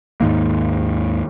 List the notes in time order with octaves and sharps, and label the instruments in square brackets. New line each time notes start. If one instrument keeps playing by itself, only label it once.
[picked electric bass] D#2 G#2 D#3 A#3